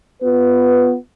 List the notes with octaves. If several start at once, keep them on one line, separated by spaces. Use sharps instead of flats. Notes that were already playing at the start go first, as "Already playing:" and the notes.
B3 F4 B4